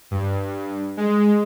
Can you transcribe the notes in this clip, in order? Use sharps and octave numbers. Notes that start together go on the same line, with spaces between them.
G2
G#3